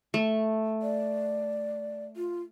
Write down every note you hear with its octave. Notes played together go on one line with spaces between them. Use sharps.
A3
D5
F4